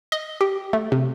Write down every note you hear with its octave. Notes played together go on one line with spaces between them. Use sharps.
D#5
G4
A3
C3